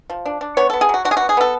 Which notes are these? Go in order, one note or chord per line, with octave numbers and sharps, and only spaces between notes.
F3
D4
D4
B3 C#5
B3 A4
G#4
F#3 F#4
D4 F#4
G#4
B3 F#4
G#4
B3 A4